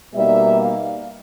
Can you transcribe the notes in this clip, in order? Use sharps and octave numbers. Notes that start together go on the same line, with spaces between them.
B2 G3 A#3 D#4 E5
F5